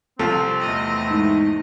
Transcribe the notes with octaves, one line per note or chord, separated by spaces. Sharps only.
C2 F3 C4 A4
E2 A3 D#5
G#2